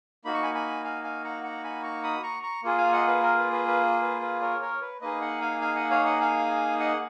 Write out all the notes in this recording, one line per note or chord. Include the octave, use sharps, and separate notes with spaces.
A#3 D#4 F#4 B5
C#6
G#5 B5
G#5 B5
F5 G#5
F5 G#5
F#5 A#5
F#5 A#5
G#5 B5
A#5 C#6
B5 D#6
A#5 C#6
A#5 C#6
A#3 F4 G#4
F5 G#5
D#5 F#5
B4
A#4
B4
B4
B4
B4
B4
A#4 C#5
A#4 C#5
B4
A#3 D#4 G#4 B4 D#5
D#5 F#5
F5 G#5
F5 G#5
D#5 F#5
C#5 F5
D#5 F#5
F5 G#5
D#5 F#5